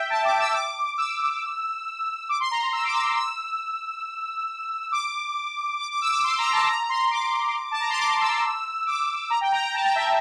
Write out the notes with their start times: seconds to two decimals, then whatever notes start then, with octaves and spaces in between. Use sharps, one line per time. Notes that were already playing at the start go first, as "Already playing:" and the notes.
Already playing: E5 G5
0.10 A5
0.25 D6
0.39 E6
0.54 D6
0.98 E6
2.29 D6
2.40 C6
2.51 A#5
2.73 E6
2.84 D6
2.94 E6
3.17 E6
4.92 D6
5.80 D6
5.91 D6
6.01 E6
6.12 D6
6.24 C6
6.38 A#5
6.53 A5
6.67 A#5
6.83 A#5
6.89 C6
7.11 D6
7.71 A5
7.80 A#5
7.90 C6
7.99 D6
8.21 E6
8.87 D6
9.30 A#5
9.41 G5
9.52 A#5
9.63 A#5
9.74 A5
9.85 G5
9.96 E5